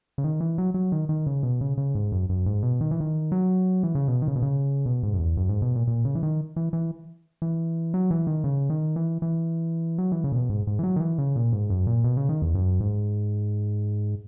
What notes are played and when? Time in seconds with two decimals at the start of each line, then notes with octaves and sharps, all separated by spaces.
0.18 C#3
0.24 D#3
0.40 E3
0.58 F#3
0.74 F#3
0.92 D#3
1.09 D#3
1.26 C#3
1.43 B2
1.61 C#3
1.78 C#3
1.95 G#2
2.12 F#2
2.29 F#2
2.46 G#2
2.62 B2
2.81 D#3
2.91 E3
3.00 D#3
3.32 F#3
3.83 E3
3.95 C#3
4.08 B2
4.22 D#3
4.28 C#3
4.36 B2
4.42 C#3
4.86 B2
5.03 G#2
5.14 F#2
5.19 E2
5.37 F#2
5.49 G#2
5.62 B2
5.76 A#2
5.87 A#2
6.05 C#3
6.15 E3
6.23 D#3
6.56 E3
6.73 E3
7.42 E3
7.94 F#3
8.11 E3
8.27 D#3
8.44 C#3
8.70 D#3
8.96 E3
9.22 E3
9.98 F#3
10.12 E3
10.24 C#3
10.32 A#2
10.36 B2
10.50 G#2
10.67 G#2
10.79 E3
10.83 F#3
10.96 D#3
11.01 E3
11.18 C#3
11.36 A#2
11.53 G#2
11.70 F#2
11.87 A#2
12.04 B2
12.17 C#3
12.29 D#3
12.42 E2
12.55 F#2
12.80 G#2